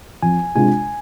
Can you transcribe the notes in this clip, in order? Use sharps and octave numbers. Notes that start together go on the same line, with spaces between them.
F2 G#5
C3 G#3 D4 F4 G#5